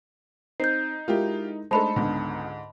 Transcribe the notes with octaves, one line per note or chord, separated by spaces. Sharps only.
C4 D#4 G6 C7
G#3 E4 F4 G4 A#4
G#3 A3 D4 D#4 A4 C5 A5 B5
C#2 G#2 D3 B3